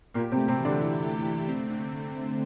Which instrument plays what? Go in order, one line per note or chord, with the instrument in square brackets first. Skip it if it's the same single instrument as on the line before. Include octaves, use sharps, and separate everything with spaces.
[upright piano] A#2 A#3 [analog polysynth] G4
[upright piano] C3 C4
[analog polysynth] A3
[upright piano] C3 C4
[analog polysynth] E3
[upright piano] D3 D4
[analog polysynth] E4
G4
A3
C4
D3